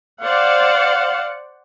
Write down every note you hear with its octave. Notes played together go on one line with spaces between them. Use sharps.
C5 D5 F5 F#5